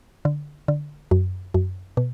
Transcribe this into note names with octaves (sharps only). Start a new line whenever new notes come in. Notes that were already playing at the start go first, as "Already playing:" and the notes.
D3
D3
F#2
F#2
B2